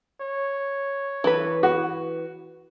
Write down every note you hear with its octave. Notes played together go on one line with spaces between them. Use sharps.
C#5
E3 B4
F#4